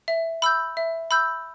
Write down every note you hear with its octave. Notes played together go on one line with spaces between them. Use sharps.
E5
B5 E6 G6
E5
B5 E6 G6